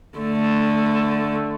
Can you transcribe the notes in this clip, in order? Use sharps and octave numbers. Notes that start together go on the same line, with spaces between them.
D3 A3